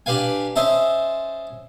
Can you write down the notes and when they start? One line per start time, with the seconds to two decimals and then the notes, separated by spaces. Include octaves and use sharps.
0.06 D4 G4 B4 F5 G#5
0.56 C#4 C5 D#5 E5 A5